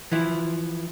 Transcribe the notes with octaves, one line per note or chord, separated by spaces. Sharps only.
E3 F3 E4